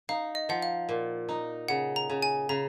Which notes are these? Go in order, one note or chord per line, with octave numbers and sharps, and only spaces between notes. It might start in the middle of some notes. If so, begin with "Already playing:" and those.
D#4 F5
D#5
F3 F#5
F5
A#2
D#4
C#3 F#5
A#5
C#3
G#5
C#3 A#5